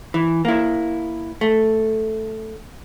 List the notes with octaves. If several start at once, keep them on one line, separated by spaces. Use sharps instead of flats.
E3
A#3 E4
A3